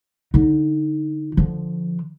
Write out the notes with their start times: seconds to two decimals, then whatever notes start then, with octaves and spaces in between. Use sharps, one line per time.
0.34 D3 D#4
1.37 D3 F3